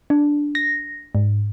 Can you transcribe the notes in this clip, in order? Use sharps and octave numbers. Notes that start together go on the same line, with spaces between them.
D4
A#6
G#2